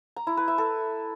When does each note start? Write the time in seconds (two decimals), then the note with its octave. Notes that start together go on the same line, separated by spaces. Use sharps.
0.16 A#5
0.27 E4
0.37 B4
0.48 E5
0.58 A4